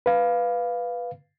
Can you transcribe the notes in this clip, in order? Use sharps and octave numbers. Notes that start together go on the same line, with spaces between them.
B4 F5